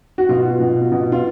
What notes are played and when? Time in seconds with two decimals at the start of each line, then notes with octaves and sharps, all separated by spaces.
0.18 F#4
0.29 B2 F4
0.60 B2
0.92 B2
1.12 F4